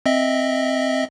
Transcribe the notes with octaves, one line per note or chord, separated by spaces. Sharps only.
C4 D#5 E5